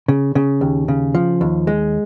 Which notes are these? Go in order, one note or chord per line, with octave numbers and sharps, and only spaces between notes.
C#3
C#3
D#2
C#3
F3
D#2
G#3